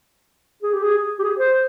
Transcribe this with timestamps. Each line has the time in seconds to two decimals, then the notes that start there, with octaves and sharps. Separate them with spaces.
0.62 G#4
0.73 G4
0.83 G#4
1.19 G4
1.24 G#4
1.39 C5